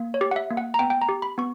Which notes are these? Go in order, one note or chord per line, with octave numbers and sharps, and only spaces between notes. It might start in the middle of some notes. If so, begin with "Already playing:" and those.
Already playing: A#3
C#5
G4
F#5
E5
A#3
F#5
A#5
B3 G5
G5
A#5
G4
B5
B3 C#6